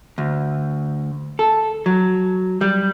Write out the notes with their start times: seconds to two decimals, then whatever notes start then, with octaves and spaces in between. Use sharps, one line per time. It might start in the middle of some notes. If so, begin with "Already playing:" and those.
0.18 D2
1.39 A4
1.86 F#3
2.61 G3